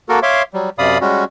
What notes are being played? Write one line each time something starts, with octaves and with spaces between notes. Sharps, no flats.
A#3 F#4 A4 A#4
C#5 E5 F5 C6 D6
F#3 G3
F#2 C3 D5 F5 B5 D#6
G3 G#3 C#4 F#4